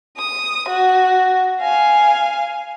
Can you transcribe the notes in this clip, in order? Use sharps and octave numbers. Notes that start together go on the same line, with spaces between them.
D#6
F#4
F5 G#5